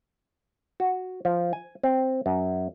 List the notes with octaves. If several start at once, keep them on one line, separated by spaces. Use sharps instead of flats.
F#4
F3
G#5
C4
F#2